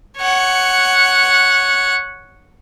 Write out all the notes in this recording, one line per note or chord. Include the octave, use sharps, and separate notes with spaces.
C#5 F#5